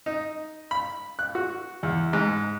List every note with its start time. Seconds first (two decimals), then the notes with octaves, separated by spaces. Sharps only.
0.06 D#4
0.71 B5
1.19 F#6
1.35 F#4
1.83 E2
2.13 G#2